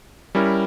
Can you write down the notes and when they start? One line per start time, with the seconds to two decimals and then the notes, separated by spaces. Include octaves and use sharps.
0.35 G3 C#4 E4 A#4